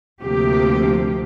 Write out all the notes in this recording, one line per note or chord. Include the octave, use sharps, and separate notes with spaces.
D2 C3 F3 A#3 G4